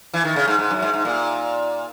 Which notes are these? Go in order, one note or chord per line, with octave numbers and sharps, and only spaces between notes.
E3
D#3
C#3
G#2
G#2
F#2
G#2
G#2
A#2